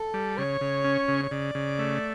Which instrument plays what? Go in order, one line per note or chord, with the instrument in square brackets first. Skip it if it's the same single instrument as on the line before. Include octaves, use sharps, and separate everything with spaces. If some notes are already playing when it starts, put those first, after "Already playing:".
Already playing: [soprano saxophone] A4
[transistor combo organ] G3
[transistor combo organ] C#3 [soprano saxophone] C#5
[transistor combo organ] C#3
C#4
C#3
[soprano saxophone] C#5
[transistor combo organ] C#3 [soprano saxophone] D5
[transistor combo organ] C#3
A3